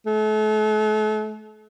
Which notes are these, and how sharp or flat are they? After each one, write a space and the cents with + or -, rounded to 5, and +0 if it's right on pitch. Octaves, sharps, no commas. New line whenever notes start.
A3 -40